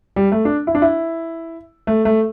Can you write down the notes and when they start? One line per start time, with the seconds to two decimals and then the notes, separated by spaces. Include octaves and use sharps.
0.16 G3
0.32 A3
0.45 D4
0.67 E4
0.75 D4
0.82 E4
1.87 A3
2.05 A3